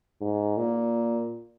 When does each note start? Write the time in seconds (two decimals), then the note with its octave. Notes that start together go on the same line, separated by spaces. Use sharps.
0.21 G#2
0.57 A#2